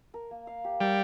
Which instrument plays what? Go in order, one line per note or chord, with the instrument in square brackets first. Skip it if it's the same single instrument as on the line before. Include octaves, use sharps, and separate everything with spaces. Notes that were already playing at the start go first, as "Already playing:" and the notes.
[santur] A#4
A#3
F5
G4
[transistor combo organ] G3 [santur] A#4